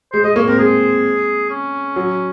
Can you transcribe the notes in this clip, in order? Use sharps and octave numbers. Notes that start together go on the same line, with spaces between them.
G#3 C5
G#3 D#5
A#3 C#5
C4 A#4
G#3 G#4
C#4
F#3